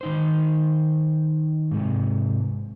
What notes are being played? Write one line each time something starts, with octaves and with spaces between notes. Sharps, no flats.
D#3 D#4 C5
G#2 C3